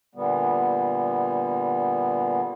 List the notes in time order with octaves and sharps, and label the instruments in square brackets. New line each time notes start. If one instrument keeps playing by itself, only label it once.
[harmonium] A#2 D3 G3 B3